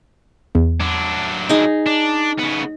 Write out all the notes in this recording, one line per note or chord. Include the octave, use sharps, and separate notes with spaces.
E2
F#3 D4
D#4 G#4
D4
C#3 B3